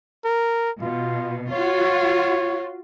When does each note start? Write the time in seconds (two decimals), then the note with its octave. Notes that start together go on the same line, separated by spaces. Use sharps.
0.25 A#4
0.82 B2 F4
1.52 F4 F#4 C#5